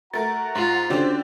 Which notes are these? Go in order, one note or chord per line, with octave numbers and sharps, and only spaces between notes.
A3 F#4 A#4 F#5 A#5 A6
G#2 F4
D3 C#4 D4 F#4 G4 C5 D5